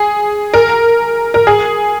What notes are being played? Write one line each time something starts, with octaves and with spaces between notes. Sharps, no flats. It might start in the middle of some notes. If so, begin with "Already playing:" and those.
Already playing: G#4
A#4
A#4
G#4